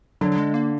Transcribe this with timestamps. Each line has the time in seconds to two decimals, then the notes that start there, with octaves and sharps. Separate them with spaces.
0.21 D3 F#3
0.32 F#3
0.38 G#3
0.54 A#3